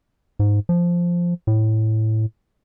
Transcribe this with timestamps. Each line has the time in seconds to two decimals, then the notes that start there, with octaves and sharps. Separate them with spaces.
0.39 G#2
0.69 F3
1.47 A2